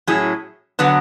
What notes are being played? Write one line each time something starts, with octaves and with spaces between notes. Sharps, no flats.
A2 F#3 C#4 E4 G#4
D3 F#3 B3 D4 F#4